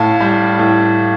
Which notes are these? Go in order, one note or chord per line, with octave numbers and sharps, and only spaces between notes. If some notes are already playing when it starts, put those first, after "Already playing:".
Already playing: A2 F5 A5
G3
A2